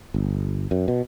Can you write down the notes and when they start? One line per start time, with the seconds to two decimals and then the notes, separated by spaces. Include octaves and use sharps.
0.14 G1
0.71 F#2
0.88 B2